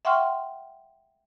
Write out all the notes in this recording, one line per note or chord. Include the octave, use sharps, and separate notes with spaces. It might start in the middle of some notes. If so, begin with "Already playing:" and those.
E5 F#5 G5 C6 C#6 F6